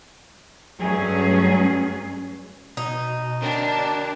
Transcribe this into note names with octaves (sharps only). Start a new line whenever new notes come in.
G2 F#3 A3 C#4 G#4
B2 D#4
D4 A#4 C#5 G5